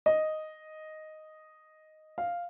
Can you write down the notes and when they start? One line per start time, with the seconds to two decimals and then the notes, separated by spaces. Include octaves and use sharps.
0.06 D#5
2.18 F5